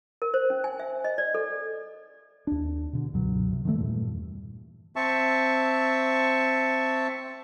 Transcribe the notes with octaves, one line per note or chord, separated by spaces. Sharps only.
A#4
C5
C#4
G#5
E5
D#5
D5
A4
D#2 D4
B2 D3
C#2 G2 B2 F#3
C3
D#3 F3 F#3 A3
E2 G2 A#2 E3
C4 E5 A5 C#6